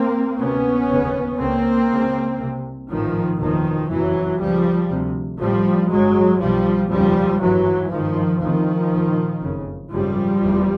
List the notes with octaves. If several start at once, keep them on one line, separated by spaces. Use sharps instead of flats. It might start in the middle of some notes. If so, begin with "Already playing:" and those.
Already playing: A#3 C4
D2 C3 B3 C#4
F1 D#2 C#3
C#2 C#3 A#3 C4
C#2 C#3
C2 C3
A1 G#2 D#3 F3
F#1 E2 B2 D#3 F3
F#1 F2 C3 E3 F#3
C#2 C#3 F3 G3
D2 C3
A1 A2 F3 G3
G1 G2 F#3 G#3
B1 B2 F3 G3
F1 D#2 C#3 F3 G3
G#1 G2 E3 F#3
G#1 G2 D#3 F3
D2 C3 D#3 F3
A#1 A#2
F#1 F2 C#3
G#1 F#2 C#3 F3 G3
F1 E2 C3